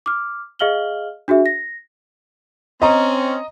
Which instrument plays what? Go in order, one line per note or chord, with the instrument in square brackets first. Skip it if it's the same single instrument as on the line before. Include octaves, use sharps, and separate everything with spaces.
[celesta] D6 F6
G#4 D#5 F5 F6 F#7 G7
D4 F#4 G#4 E5
A#6
[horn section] C4 C#4 [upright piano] D#5 A#5